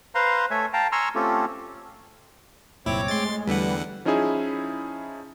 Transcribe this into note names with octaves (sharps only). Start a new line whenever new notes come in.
B4 C5 F5 A#5 C6
A3 A4 C#5 E5 G#5
F5 G5 A5 A#5
G#5 A#5 C6 C#6 E6 F6
A3 C4 C#4 F4 G4 A4
D#1 C2 F#2 A#2 C4 E4 C#5 D6
G#3 A3 C6 A6
E2 D3 G3 B4 F#5
F3 C#4 D#4 E4 G#4 E5